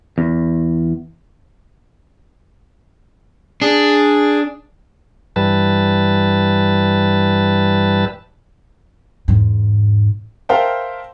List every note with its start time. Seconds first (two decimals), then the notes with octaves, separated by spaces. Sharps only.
0.18 E2
3.62 D4 G#4
5.36 G2 E3 G3 B4 A5
9.28 E2 G#2
10.49 A#4 C5 E5 F5 G5 A5